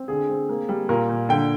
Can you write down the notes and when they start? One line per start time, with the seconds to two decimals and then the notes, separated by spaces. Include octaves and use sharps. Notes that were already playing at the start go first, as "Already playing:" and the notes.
Already playing: C4
0.08 D3 G#4
0.29 C4
0.49 A#3
0.69 G3
0.89 A#2 A#4
1.09 A#2
1.29 D3 G5